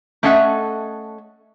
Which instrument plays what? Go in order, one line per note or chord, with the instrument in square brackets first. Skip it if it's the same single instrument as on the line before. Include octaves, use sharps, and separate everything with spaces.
[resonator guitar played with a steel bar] A3 C#4 A4 D#5 E5 F#5